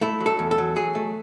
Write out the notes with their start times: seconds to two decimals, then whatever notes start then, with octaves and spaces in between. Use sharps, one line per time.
0.01 A3 E4
0.20 F#3
0.26 A4
0.39 E2
0.51 A4
0.58 F#3
0.76 F#3 G#4
0.95 A3